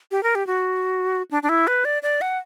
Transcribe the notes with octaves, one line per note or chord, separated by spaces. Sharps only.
G4
A#4
G4
F#4
D4
D4
E4
B4
D5
D5
F#5